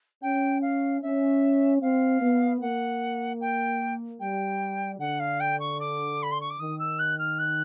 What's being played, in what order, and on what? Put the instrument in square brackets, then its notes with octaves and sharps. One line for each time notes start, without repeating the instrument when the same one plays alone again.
[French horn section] C#4 [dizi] G5
[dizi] F5
[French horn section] C#4 [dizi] E5
[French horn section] C4 [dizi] F5
[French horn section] B3
[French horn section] A#3 [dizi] F#5
[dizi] G5
[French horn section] G3 [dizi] G5
[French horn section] D3 [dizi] F#5
[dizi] F5
G5
C#6
D6
B5
C6
C#6
D6
[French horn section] D#3 [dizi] D#6
[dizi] E6
F#6
F6
F#6